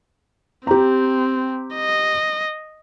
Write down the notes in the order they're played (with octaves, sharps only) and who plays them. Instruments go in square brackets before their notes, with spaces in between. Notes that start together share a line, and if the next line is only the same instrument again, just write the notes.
[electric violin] C4 [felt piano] G4 A#5
[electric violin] D#5